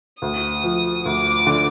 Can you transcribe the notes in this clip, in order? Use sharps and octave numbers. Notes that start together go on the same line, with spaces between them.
D2 D#6
F3
D2 D6
D3